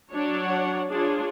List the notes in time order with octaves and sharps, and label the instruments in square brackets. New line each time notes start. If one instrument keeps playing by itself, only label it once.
[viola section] F#3 D4 C#5
[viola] F#5
[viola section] D4 F4 [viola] G#4 C#5